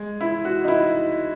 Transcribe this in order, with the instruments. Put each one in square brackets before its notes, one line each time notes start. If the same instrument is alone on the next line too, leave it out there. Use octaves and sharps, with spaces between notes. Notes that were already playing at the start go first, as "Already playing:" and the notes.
Already playing: [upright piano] G#3
E4
F#4
D#4
E4